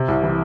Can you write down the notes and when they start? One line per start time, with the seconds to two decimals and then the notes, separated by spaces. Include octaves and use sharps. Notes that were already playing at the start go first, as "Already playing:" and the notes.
Already playing: C3
0.08 C2
0.24 E3